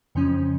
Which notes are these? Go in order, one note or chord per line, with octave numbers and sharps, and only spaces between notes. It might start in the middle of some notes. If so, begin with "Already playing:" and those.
F2 C#3 F3 C#4